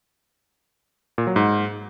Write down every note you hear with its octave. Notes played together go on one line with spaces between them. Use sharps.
A#2
F#3
G#2